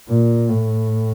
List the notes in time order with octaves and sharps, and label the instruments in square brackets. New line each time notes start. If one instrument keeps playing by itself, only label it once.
[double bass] A#2
A2